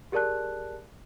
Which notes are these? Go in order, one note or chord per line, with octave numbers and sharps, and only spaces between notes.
G4 G#4 A#4 D5 A5 F#6